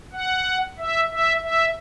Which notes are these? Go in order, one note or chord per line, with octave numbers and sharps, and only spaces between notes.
F#5
E5
E5
E5